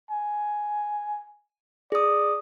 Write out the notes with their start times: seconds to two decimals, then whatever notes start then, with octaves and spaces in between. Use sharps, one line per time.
0.11 G#5
1.92 G#4 D5 D#6